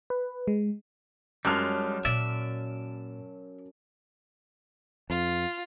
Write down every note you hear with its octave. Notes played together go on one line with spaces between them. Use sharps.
B4
G#3
F#2 G3 G#3 F4 A5 F6 F#6
A#2 D5 E5
F2 F4